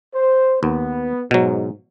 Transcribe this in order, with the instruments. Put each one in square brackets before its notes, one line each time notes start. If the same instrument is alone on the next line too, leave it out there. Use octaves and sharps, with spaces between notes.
[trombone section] C5
[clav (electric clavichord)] D#2 [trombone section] B3
[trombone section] G#2 [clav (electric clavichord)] B2 F#3